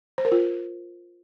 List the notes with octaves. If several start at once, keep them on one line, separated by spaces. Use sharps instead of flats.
C5
A#4
F4